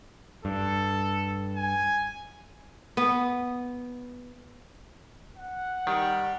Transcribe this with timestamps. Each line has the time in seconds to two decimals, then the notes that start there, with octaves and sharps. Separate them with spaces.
0.45 G2 A4
1.56 G#5
2.97 B3
5.37 F#5
5.87 D#3 G3